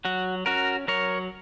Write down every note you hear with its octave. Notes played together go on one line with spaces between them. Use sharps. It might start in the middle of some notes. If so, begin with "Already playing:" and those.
F#3 F#4
C#4 F#4 A#4
F#3 A#4 C#5